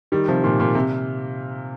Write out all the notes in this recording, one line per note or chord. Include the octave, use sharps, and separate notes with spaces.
D#3 G3
C3 F3
A#2 D#3
A#2
C3